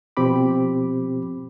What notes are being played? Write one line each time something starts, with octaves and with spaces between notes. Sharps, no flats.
B2 F3 C4 G4 B5 D6